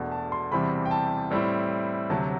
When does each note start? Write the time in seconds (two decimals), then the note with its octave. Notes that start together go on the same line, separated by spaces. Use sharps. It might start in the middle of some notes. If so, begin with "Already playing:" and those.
Already playing: E1 E2 B2 A3 D4
0.12 A5
0.32 C6
0.51 E2 C3 E3 G3 C4 B5
0.86 G5
0.91 A5
1.31 A2 G3 C4 E4
2.10 D2 C3 F#3 A5